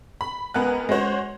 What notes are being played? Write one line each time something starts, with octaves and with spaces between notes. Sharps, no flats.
B5
C#2 B3 A#4 G#5 F#6
G#3 C#4 F#4 C5 C#5